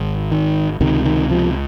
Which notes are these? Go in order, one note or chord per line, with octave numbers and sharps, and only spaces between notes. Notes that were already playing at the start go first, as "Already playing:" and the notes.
Already playing: G#1
D#3
C#2 C3 D#3
D#3
F3